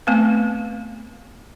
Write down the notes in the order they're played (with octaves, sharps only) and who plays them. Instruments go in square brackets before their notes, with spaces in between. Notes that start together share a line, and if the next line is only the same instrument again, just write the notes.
[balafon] A3 B3 C4 B4